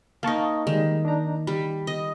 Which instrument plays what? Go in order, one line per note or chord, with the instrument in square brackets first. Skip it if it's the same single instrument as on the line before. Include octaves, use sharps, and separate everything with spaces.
[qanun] A#3 D#4 [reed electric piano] F5 A5 C#6
[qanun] D#3 [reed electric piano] G3 G#3 D#4
[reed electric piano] D4 D#4 A#5
[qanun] G3 [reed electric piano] B5
[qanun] D#5